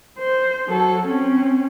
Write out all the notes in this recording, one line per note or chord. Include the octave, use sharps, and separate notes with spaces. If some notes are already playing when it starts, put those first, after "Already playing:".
C5
F#3 A4
C4 C#4